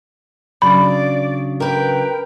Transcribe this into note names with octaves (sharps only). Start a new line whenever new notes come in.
C#3 F#3 D4 D5 B5
A#4 B4 G5